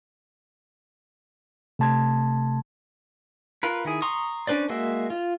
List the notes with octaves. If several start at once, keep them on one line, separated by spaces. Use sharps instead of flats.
C3 A3 A5 C6 G#6
F4 A#4 B4
D#3 E4 G#4
A#5 C6 C#6 D#6
C#4 D4 B4 C5 D5
G#3 A#3 F#4 E5
F4